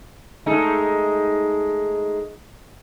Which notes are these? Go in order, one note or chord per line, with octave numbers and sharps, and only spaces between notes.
G#3 A3 D#4